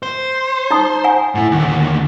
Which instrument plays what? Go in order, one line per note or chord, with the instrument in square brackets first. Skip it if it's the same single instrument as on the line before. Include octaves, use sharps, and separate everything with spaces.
[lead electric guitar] C5
[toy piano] D#4 A#5 D#6
F#5 G#5
[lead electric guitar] A2 E4
D#2 D3